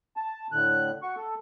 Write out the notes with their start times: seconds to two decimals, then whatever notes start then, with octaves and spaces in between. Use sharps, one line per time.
0.17 A5
0.52 A2 D3 F#6
1.02 F#4 C#6
1.16 A4